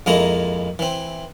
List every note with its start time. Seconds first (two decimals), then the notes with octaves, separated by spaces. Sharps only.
0.06 F2 G#3 A#3 E4 A#5
0.79 E3 C4